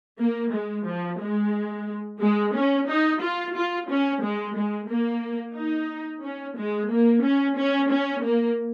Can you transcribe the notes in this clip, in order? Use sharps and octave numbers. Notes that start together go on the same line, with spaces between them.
A#3
G#3
F3
G#3
G#3
C#4
D#4
F4
F4
C#4
G#3
G#3
A#3
D#4
C#4
G#3
A#3
C#4
C#4
C#4
A#3